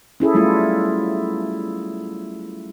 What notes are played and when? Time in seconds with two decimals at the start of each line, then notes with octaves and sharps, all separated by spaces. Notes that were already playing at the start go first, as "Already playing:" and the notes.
0.20 C#4 E4 G#4 A4
0.34 F#3 G3 A3 B3 E4 F4